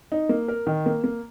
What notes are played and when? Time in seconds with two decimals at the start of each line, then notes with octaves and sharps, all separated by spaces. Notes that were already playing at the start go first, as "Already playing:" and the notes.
0.12 D#4
0.29 A#3
0.48 A#4
0.67 D#3
0.86 A#3
1.04 A#3